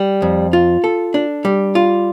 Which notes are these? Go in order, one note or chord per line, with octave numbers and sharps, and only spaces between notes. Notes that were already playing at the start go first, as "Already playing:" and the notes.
Already playing: G3
F2
F4
A4
D4
G3
F4